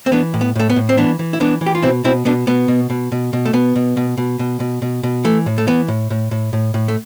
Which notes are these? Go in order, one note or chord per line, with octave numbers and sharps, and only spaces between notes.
C4
E3 B3 D4
A2
B3
A2 A3
B3
A2
C4
E3 B3 D4
E3
E4
E3 B3 D4
E3
G4
F4
B2 C4 E4
B2 C4 E4
B2 B3 D4
B2 B3
B2
B2
B2
B2
A3
B2 B3
B2
B2
B2
B2
B2
B2
B2
E3 A3
A2
A3
E3 B3
A2
A2
A2
A2
A2
A3